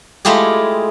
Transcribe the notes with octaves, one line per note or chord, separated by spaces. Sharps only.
G#3 A3 E4 F4 G4 G#4